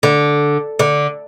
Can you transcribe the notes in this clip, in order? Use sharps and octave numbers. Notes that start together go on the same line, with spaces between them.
D3
D3